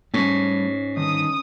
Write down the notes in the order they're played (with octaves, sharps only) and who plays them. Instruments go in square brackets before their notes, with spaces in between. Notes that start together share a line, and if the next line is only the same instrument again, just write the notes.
[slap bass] G#2 [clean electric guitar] G3 A3 [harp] C#4
[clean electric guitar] G2 D3 D#3 [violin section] D#6